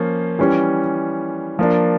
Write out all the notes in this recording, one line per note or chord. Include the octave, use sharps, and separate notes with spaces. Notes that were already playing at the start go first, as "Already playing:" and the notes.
Already playing: F3 A#3 C#4
E3 G3 C#4
F3 A#3 D4